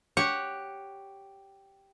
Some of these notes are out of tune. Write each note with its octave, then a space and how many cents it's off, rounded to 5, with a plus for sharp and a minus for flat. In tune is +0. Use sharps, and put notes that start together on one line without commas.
G4 +0 C#5 +0 F#5 +0